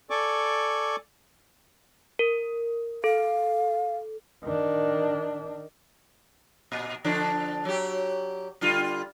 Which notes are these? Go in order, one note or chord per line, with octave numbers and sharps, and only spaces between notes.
A4 D5 G#5 C#6 D6
A#4
A4 F5
D#3 D4
A#2
D3 F3 D4
F#3 G4
D3 G3 F4